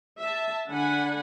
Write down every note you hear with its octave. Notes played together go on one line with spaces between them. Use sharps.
E5 A5
D3 D4 F#5 G#5 B5